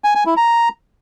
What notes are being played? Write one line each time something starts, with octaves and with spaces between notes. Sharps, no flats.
G#5
G#5
E4
A#5